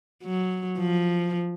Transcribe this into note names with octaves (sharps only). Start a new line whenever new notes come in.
F#3
F3